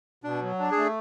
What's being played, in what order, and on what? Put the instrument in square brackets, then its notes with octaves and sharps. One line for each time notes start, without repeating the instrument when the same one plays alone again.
[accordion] B2 [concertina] D4
[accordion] F#3
D4
[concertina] G#4
[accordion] A3